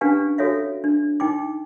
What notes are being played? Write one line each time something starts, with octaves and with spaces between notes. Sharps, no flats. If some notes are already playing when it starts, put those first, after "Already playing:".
C#4 D4 G4 B4 F5 G#5
F#4 A4 C#5 E5 F5
D4
D#4 G5 D6